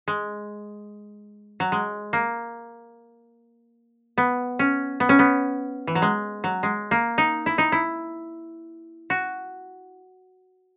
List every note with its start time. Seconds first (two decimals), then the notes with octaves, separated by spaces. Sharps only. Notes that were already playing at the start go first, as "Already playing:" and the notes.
0.08 G#3
1.60 F#3
1.72 G#3
2.13 A#3
4.18 B3
4.59 C#4
5.00 B3
5.09 C#4
5.19 B3
5.87 E3
5.95 F#3
6.02 G#3
6.44 F#3
6.63 G#3
6.91 A#3
7.18 D#4
7.46 E4
7.58 D#4
7.72 E4
9.10 F#4